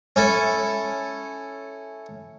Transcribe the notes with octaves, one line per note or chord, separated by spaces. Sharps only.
C#4 E4 A4